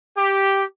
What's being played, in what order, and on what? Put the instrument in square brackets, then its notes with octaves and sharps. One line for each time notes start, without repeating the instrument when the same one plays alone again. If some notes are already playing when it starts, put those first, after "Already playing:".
[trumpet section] G4